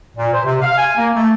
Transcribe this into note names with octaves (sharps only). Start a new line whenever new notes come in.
A#2
C5
C3
F5
G#5
A#3
A3